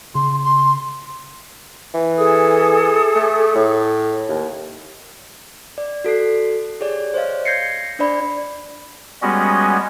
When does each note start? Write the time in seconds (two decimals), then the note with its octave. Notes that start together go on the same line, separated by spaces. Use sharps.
0.15 C#3 C6
0.45 C6
1.94 E3
2.18 G#4 A4 D#6
3.15 A3
3.56 A2
4.29 D#2
5.78 D5
6.04 F#4 A4 F#6 C7
6.80 G4 G#4 C#5 D5
7.14 C5 C#5 D#5 F5
7.45 G6 G#6 A#6 C7 C#7
7.99 D4 C5 D5 B5
9.22 G3 G#3 B3 C#4 F#4 D#5